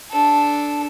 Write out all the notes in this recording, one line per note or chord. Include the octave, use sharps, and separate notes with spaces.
D4 A4